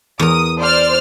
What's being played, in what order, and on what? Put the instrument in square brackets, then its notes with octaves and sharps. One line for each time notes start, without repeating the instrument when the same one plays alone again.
[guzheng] E2 A#4 [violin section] D#6
[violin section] C5 D5 F6